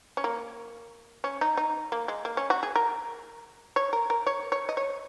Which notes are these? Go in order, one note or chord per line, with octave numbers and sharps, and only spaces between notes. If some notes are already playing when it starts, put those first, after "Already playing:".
C#4
A#3
C#4
D#4
D#4
A#3
G#3
A#3
C#4
F#4
G#4
A#4
C#5
A#4
A#4
C#5
C#5
D#5
C#5